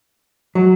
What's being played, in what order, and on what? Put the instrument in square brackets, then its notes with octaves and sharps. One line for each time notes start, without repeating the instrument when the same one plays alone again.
[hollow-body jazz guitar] F#3